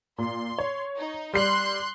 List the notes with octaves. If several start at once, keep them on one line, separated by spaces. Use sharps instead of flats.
A#2 C6
C#5
D#4
G3 C6 F#6 C7